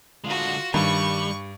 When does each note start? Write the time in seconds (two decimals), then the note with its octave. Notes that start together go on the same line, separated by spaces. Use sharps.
0.24 D3 G#3 F4 F#4
0.74 G2 D#3 G3 C#6